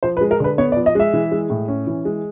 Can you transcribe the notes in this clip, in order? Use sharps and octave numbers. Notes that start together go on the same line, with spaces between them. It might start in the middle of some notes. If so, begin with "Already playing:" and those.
F3 C5
B4
G#3
A#4
D3 B4
B3 C#5
D5
F3
D#5
G#3 E5
E3
G#3
A2
C#4
E3
G#3